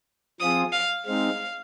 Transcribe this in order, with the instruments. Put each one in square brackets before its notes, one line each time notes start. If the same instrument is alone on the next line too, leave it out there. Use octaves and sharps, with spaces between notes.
[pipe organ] F3 C4 F4 G#4 [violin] D#6
[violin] F5
[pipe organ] G#3 C4 D#4 [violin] F5